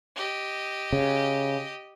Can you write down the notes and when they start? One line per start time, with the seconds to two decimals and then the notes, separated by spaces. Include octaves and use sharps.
0.16 G4 D#5
0.93 C#3